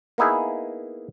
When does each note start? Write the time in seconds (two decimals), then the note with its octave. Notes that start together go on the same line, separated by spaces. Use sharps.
0.18 A#3 B3 D#4 E4 G#4